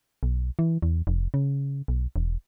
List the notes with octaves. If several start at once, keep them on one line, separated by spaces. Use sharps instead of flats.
B1
E3
E2
F1
C#3
B1
E1